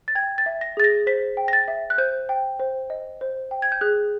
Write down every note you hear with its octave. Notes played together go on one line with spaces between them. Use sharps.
A6
G5 G#6
A6
E5
A#6
G#4 A6
A#6
C5 B6
G5
A#6
A6
E5
F#6
C5 G6
G5
C5
D#5
C5
G5
G#6
G6
G#4 F#6